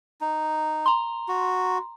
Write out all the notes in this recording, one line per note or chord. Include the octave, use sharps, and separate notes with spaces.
D#4
A#5 C6
F#4